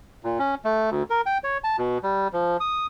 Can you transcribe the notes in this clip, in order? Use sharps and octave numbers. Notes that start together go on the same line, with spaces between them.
A#2
C#4
A3
D2
A#4
G5
C#5
A5
B2
G3
F3
D#6